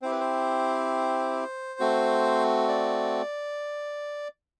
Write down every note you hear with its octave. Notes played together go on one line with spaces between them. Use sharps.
C4 E4 G4 C5
B4
C5
A3 C4 F#4
D5